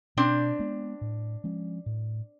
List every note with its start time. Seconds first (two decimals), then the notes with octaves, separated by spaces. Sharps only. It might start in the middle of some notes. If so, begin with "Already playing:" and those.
0.17 B2 C4 D4
0.59 G#3 B3
1.01 A2
1.44 F3 G#3 C#4
1.86 A2